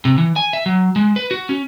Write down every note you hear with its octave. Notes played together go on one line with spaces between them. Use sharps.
C3
E3
G#5
E5
F#3
G#3
B4
F#4
C#4